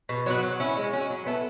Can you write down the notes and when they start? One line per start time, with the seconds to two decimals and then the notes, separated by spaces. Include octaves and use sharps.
0.09 B2
0.26 F#3 B3 F#4
0.43 F#3
0.60 C#4 E4
0.76 G#3
0.93 C#4 F#4
1.10 F#3
1.26 B3 E4 A4